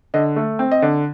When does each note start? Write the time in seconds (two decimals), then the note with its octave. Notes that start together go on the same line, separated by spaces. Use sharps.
0.14 D3 D#5
0.36 A3
0.59 C4
0.71 D#5
0.82 D3